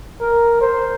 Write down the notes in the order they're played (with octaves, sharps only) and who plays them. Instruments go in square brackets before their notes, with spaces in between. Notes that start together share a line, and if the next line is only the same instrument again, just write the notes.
[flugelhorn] A#4
C5